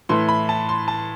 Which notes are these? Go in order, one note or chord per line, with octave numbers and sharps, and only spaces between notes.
A2 E3 A3 C6
B5
A5
C6
A5